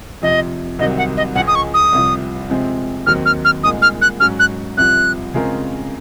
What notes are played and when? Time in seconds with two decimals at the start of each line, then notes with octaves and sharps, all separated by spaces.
0.22 F2 C3 F3 D#5
0.79 C2 C3 D#3 F#3 C4 D#5
0.98 F#5
1.17 D#5
1.35 C#2 C#3 F3 G#3 C#4 F#5
1.47 D#6
1.55 C#6
1.74 D#6
1.93 C2 C3 F3
2.50 C3 F3 G#3 C4
3.06 D#2 D#3 F#3 C4 F6
3.26 F6
3.45 F6
3.63 C2 A#2 G#3 D#4 D#6
3.82 F6
4.02 F#6
4.20 G#2 F#3 C#4 F6
4.40 F#6
4.77 C2 C3 F3 F#6
5.34 C#3 G#3 C4 F4 A#4